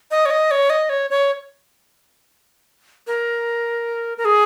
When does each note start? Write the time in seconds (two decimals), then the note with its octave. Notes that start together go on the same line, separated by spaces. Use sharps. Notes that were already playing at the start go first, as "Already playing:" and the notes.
0.11 D#5
0.26 C#5
0.30 D#5
0.51 C#5
0.70 D#5
0.89 C#5
1.10 C#5
3.07 A#4
4.18 A#4
4.25 G#4